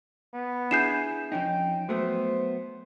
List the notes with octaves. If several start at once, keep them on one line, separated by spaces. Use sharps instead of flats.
B3
D4 E4 G#4 G6 C7 E7
F2 C#4 D#4 G5
F#3 A3 B3 C5